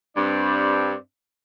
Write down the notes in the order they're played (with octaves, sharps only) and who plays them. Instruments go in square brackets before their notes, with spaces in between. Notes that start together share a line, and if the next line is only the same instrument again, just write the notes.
[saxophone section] G2 [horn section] C4 D4 D5